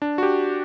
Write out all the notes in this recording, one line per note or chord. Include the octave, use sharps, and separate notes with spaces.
D4
F#4
G4